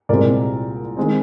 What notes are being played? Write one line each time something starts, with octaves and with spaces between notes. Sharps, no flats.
C2 A#2 G#3 C4 A#4 D5
D#3 G#3 C4